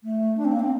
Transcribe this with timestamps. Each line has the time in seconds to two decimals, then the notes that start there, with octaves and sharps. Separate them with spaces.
0.03 A3
0.37 D4
0.45 C4
0.52 A#3
0.60 C4